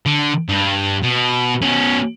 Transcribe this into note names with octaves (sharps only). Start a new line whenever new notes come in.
D3
G2
B2
B2 C#4